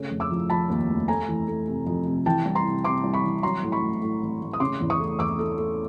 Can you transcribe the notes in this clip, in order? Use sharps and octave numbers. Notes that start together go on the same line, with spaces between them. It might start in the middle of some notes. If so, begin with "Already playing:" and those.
Already playing: C#3 A3
F1
D6 E6
F3
F3 A5 B5
D#2
F1
A3 G#5 A#5
E3
A3
C3
F2
C3
E3 G5 A5
C2
A#5 C6
C3
C3 C6 D6
C2
B5 C#6
E3
F#3 A#5 C6
A2
B5 C#6
A1
A2
A1
A1
D#6
C#3 C6 D6
E2
C#6 D#6
A3
E2 D6 E6
A3
A3